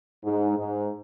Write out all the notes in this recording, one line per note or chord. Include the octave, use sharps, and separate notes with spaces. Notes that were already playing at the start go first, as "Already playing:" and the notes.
G#2
G#2